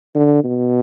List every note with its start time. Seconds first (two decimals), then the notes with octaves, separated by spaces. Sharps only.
0.15 D3
0.44 B2